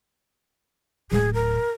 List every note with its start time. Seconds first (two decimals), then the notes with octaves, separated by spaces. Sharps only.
1.12 D1 A2 G#4
1.34 A#4